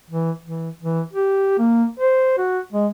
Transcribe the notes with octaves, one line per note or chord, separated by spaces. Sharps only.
E3
E3
E3
G4
A#3
C5
F#4
G#3